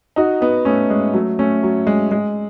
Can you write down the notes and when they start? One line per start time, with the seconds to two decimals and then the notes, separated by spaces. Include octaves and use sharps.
0.16 D#4 F#4
0.41 B3 D#4
0.65 A3 C#4
0.90 G#3
1.14 F#3 A3
1.39 A3 C#4
1.63 F#3
1.87 G#3
2.11 G#3